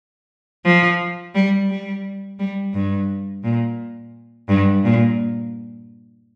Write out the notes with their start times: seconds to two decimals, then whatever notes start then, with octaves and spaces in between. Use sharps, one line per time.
0.65 F3
1.35 G3
1.70 G3
2.39 G3
2.74 G2
3.44 A#2
4.49 G2
4.85 A#2